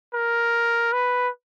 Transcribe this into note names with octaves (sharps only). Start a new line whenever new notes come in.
A#4
B4